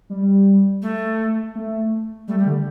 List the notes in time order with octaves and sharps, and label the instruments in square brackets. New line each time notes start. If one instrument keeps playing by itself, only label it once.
[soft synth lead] G3
[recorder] A3
[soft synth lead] A3
[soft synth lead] G3 [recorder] A3
[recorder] G3
[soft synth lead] D3